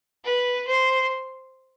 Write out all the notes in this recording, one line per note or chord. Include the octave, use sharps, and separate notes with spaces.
B4
C5